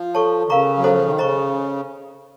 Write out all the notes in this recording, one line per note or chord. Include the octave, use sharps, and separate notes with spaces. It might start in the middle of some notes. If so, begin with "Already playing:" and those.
Already playing: F3
A4 C#5 A5 C#6
D#3
C#3 A#4 F5 A#5 C#6
F#3
C#4 A4 C5 D#5 F#5
F3
D#3
C#3 C5 D#5 A#5 C#6